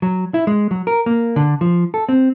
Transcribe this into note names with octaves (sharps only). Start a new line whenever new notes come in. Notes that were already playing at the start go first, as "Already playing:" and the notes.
F#3
E4
G#3
F#3
A#4
A#3
D3
F3
A4
C4